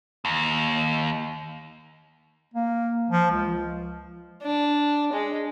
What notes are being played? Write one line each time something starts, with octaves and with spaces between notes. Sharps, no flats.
D#2
A#3
F3
C#2
D4
G#3